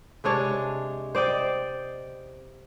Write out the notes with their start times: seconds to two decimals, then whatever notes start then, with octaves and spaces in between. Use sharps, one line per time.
0.24 C3 G#3 D4 C#5
1.15 C5 D5 D#5 G5